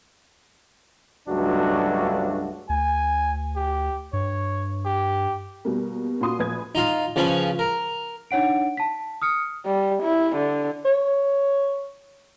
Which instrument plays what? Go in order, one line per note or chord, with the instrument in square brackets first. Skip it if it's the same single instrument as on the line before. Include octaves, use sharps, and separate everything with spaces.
[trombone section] C#2 G2 F#3 A3 D4 F#4
[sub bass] D2 [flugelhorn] G#5
[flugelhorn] G4
[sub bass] G2 [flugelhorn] C#5
[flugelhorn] G4
[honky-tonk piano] B2 G3 A#3
A#2 C#4 F4 F#4 C6 D#6
A#1 B4 G#6
[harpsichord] D#4 F4
C#3 F3 C#4 B4
A#4
[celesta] D4 D#4 C#5 F#5 D7
A5 B6
D#6 F6 C#7
[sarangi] G3
E4
D3
[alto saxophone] C#5